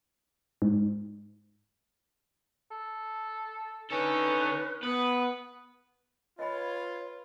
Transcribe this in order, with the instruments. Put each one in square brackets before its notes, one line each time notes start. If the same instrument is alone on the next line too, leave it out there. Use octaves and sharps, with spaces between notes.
[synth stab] G#2
[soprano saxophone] A4
[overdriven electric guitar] D3 A4 [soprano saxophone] C#4 [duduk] D#4 [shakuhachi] B4
[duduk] B3 [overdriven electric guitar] B4 [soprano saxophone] F#5 [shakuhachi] D#6
[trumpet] F4 [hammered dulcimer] B4 F5 [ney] C#5 [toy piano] D#5 G#5 B5